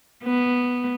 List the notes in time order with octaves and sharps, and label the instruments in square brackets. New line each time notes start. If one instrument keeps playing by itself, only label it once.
[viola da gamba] B3